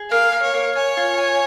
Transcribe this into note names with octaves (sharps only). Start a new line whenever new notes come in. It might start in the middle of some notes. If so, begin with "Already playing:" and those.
Already playing: G#4
A#3 F5
A#3
C#5
A#3
C#5 G#5
F4
G#5